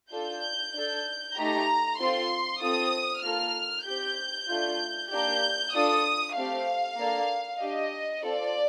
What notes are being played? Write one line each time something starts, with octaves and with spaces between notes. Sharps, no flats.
D4 F4 A4 G6
D4 A4
A3 D#4 G4 A#5
C4 F4 A4 C6
C4 F4 A4 D#6
A#3 F4 A4 F6
C4 G4 G6
A3 D4 F4
A#3 D4 G4 G6
D4 F4 A4 D#6
A3 C4 G4 F5
A#3 D4 A4
D4 G4 D#5
C4 F4 A4 D5